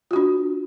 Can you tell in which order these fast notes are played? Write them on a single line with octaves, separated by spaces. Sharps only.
F4 F#4 D4